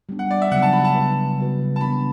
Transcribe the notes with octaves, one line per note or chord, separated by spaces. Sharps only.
G3 B3 D4
F#5
D5
E5
C#3 F#3 B3 D4 F#5
A5
B5
A5
C#3 G3 B3 E4 B4
C#3 G3 B3 F#4 B4
A5
E3 B3 D4 B5